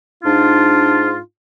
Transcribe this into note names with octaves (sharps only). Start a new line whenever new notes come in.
G#2 D4 D#4 F4